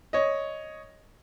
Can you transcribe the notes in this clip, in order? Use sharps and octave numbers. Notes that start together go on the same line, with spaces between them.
C#5 D#5